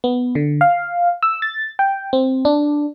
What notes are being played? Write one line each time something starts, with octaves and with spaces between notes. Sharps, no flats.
B3
D3
F5
E6
A6
G5
C4
D4